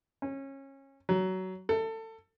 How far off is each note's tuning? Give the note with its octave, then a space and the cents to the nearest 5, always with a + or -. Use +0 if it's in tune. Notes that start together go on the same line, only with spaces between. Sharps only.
C#4 -25
F#3 +20
A4 +25